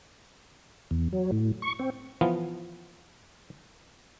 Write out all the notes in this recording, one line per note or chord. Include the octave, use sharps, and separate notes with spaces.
E2
F#3
A2
C#6
C4
E3 F3 B3 F4